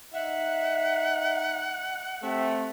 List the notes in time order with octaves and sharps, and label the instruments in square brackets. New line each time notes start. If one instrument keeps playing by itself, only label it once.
[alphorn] D#4 [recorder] E5 [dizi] F#5
[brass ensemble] A3 C4 [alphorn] G4 [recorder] E5